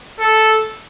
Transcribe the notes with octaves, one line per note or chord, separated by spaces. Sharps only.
A4